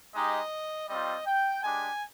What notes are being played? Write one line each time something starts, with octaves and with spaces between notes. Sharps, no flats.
G#3 D#4 G4 D#5
G3 C4 F4 D#5
G5
G#3 D4 G4 G#5